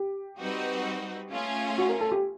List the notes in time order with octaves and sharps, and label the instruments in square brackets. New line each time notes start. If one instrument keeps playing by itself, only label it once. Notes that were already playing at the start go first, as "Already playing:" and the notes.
Already playing: [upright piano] G4
[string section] G3 C4 D#4 F#4 B4
A3 C#4 F4 G#4
[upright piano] F#4
A#4
A4
G4